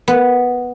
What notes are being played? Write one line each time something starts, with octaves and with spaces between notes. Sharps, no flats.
B3